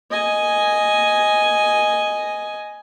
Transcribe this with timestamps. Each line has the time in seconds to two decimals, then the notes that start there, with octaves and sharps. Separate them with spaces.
0.11 D#5 G#5